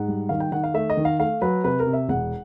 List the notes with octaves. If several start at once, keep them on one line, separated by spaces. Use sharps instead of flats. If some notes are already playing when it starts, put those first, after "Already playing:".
Already playing: G#2 F#5
G3
D#3 F5
G5
D#3 F#5
F5
A3 E5
D#5
D#3
F5
A3 F5
F#3 B4
C3 B4
A#4
C3
E5
E1 F#5